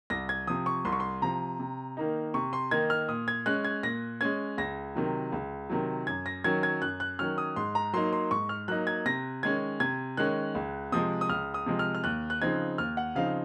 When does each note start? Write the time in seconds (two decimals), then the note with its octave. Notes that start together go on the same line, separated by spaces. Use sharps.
0.10 C2 A#6
0.29 G#6
0.47 C3 F3 D#6
0.66 C#6
0.85 C2 C6
0.93 C#6
1.00 C6
1.22 C3 F3 A#5
1.60 C3
1.97 D#3 A#3 D#4
2.34 C3 C#6
2.53 C6
2.71 D#3 A#3 D#4 G#6
2.90 F6
3.09 A#2 D#6
3.28 G#6
3.46 G#3 C#4 F#6
3.65 G#6
3.83 A#2 A#6
4.21 G#3 C#4 G#6
4.58 C#2 A#6
4.95 C3 D#3 F#3
5.32 C#2
5.70 C3 D#3 F#3
6.07 F#2 G#6
6.26 A#6
6.44 D#3 F#3 C#4 G#6
6.63 G#6
6.81 F#2 F#6
7.00 F#6
7.19 D#3 F#3 C#4 F6
7.38 D#6
7.56 G#2 C6
7.75 A#5
7.93 F#3 A#3 D#4 C6
8.13 C6
8.31 G#2 C#6
8.49 F6
8.68 F#3 A#3 D#4 F#6
8.87 G#6
9.06 C3 A#6
9.43 D#3 G#3 C#4 G#6
9.80 C3 G#6
10.17 D#3 G#3 C#4 F#6
10.55 C#2
10.92 C3 F3 G#3 D#6
11.21 D#6
11.29 C#2 F6
11.54 D#6
11.66 C3 F3 G#3
11.79 F6
11.95 F6
12.04 D#2 F#6
12.30 F#6
12.41 C#3 F3 C4 D#4 G#6
12.78 D#2 F6
12.97 F#5
13.15 C#3 F3 C4 D#4 F5